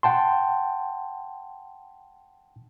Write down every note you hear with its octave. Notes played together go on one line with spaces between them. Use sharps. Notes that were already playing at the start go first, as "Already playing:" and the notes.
F#5 G5 A5 C6